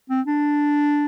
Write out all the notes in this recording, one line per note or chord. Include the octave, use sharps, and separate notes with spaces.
C4
D4